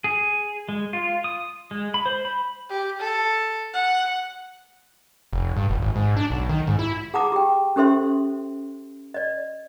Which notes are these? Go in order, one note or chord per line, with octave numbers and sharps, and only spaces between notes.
G#4
G#3
F4
D#6
G#3
B5
C5
B5
G4
A4
F#5
F1
G2
F1
G#1
G#2
D4
B1
D#3
G#2
E4
G#4 F#5 A5 A#5 D6 D#6
G4 G5
C#4 G4 A4 C5 E5 C6
D5 D#5